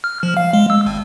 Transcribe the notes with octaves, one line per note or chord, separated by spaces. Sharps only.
F6
F3
F5
G#3
E6
G#1